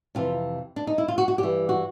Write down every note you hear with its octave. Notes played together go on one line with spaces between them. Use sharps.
F2 C3 E3 F4
D4
D#4
E4
F4
F#4
F#4
G2 E3 G4
F#4